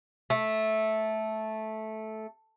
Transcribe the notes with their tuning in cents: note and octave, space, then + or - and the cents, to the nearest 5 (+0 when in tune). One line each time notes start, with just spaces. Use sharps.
A3 -10